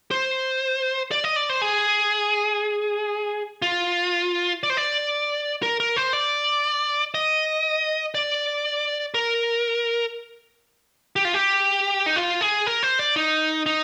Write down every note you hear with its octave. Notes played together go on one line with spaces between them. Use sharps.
C5
D5
D#5
D5
C5
G#4
F4
D5
C5
D5
A#4
A#4
C5
D5
D#5
D5
A#4
G4
F4
G4
D#4
F4
G#4
A#4
C5
D5
D#4
D#4